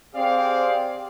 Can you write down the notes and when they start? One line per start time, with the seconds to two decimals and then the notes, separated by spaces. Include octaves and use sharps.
0.15 C4 G4 G#4 C5 D5 F5